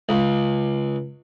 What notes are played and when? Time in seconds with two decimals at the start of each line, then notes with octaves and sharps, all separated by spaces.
0.09 C#2